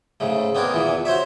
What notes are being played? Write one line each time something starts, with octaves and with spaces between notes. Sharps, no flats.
G#2 C#3 A3
B3 C4 D4 G#4 A#4
E2 A#2 E3
F#4 C5 C#5 E5